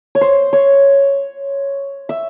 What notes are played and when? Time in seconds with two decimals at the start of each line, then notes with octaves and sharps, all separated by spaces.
0.15 C#5
0.21 C5
0.53 C#5
2.09 E5